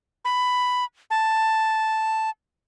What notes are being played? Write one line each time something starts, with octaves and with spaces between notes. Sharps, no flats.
B5
A5